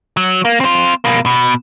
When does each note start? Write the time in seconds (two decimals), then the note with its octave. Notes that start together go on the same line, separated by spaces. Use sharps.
0.17 F#3
0.45 A#3
0.60 C4 F4
1.05 B2 A#3
1.26 B2